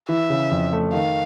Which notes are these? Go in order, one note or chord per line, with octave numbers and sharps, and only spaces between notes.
E3 E5
C#3
F2
A3
D#3 F5